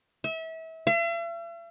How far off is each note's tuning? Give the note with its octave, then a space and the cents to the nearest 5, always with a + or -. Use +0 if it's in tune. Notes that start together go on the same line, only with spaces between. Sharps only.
E5 -30
E5 +45